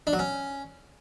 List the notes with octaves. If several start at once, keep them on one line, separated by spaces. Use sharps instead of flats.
D4
F#3
C#4